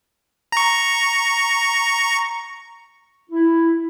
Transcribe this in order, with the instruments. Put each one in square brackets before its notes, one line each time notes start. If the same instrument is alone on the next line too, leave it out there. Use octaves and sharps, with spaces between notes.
[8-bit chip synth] A#5 C#6
[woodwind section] E4